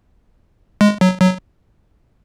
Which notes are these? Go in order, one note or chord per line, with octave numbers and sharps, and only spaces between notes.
G#3
F#3
F#3